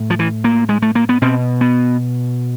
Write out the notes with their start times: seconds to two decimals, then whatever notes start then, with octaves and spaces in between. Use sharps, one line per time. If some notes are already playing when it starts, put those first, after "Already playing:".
Already playing: A2
0.10 F3
0.19 E3
0.44 A#3
0.69 G#3
0.82 A3
0.95 A#3
1.09 B3
1.22 B2 C4
1.61 B3